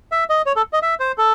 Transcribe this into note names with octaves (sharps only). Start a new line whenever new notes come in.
E5
D#5
C#5
A4
D#5
E5
C5
A4